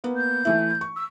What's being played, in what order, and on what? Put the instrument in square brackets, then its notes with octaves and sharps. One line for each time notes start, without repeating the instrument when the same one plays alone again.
[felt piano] A#3 B3
[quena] G6
[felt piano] E3 A3 E4
C#6
[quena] E6